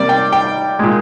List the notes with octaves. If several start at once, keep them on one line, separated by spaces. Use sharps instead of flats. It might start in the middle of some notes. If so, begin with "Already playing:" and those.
Already playing: C3 G3 A#3 D5
G5
G5
A#2 G#3